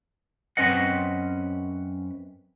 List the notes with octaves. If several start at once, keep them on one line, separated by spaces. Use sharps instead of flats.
F#2 C4 C#4 B4 D#5 F#5